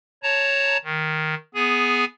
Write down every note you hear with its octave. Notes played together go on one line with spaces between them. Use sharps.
C#5 A5 A#5
D#3
B3 G#4 G#5